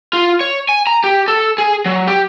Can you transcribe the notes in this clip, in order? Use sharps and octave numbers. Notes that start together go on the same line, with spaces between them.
F4
C#5
G#5
A#5
G4
A4
G#4
F#3
G4